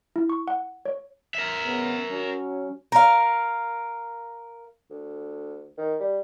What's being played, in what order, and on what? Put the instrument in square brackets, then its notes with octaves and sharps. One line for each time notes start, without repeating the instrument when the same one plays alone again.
[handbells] E4
C#6
F#5
C#5
[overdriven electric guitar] A#4 E5
[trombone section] C#3 B3
F#3 C#4
[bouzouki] A#4 F5
[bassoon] D2
D#3
G3